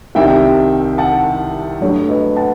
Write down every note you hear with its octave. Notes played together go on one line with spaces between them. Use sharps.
C2 C3 D#3 G3 E5 G5
F#5 A5
G2 F#3 A3
B4 D#5
F#5 A5